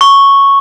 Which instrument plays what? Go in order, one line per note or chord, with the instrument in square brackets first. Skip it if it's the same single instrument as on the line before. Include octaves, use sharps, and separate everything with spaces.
[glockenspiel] C#6